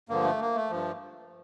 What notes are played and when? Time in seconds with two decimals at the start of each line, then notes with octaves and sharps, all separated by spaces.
0.09 G2 D3 F3 A#3
0.24 A3
0.40 A#3
0.55 A3
0.70 G2 F3